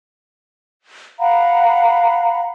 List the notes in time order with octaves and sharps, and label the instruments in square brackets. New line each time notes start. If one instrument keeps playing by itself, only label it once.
[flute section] F5 F#5 A#5 B5